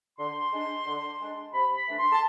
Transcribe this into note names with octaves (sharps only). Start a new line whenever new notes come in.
D3 C6
G#3 D4
D3
G#3 D4
C3 B5
B5
E3 A3 D4
C6
A5